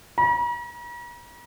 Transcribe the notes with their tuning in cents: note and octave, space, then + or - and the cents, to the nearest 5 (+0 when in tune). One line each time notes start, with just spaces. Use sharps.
A#5 +45